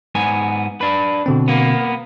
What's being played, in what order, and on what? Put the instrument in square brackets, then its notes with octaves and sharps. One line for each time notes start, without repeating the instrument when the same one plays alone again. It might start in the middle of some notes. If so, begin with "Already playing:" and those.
[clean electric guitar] G#2 B3 G#5
D4 B4
[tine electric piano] B2 D3 C4
[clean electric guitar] A#3 B3